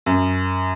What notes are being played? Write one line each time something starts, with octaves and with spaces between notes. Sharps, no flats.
F#2